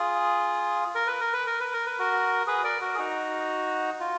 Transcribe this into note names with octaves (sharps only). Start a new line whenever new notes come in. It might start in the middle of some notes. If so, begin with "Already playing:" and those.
Already playing: F4 G#4
A#4
B4
A#4
B4
A#4
B4
A#4
B4
F#4 A#4
G#4 B4
A#4 D5
F#4 A#4
G#4
D#4 F#4
F4